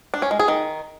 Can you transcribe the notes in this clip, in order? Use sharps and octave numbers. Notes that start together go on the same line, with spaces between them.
D4
C#4
G#3
G#4
D#3